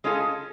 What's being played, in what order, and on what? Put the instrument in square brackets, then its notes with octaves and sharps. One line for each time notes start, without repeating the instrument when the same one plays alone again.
[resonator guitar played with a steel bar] G#3 C#4 F4 A4